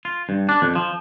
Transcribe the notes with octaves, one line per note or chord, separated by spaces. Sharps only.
F4
G2
D4
F2
F3